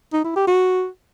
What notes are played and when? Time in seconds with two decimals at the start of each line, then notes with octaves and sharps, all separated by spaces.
0.13 D#4
0.25 E4
0.36 G4
0.47 F#4